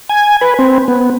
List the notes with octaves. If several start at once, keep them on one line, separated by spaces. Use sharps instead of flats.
G#5
B4
C4
B3